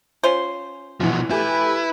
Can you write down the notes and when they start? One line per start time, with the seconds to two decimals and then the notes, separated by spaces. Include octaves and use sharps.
0.23 C#4 F4 C5
1.00 A#1 B2 E3 F3 F#4
1.30 A3 E4 G4 B4 G#5